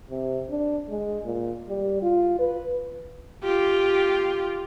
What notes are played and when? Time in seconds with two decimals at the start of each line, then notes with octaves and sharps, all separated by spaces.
0.10 C3
0.50 D4
0.89 G#3
1.24 A#2
1.68 G3
2.02 F4
2.39 B4
3.44 F4 G4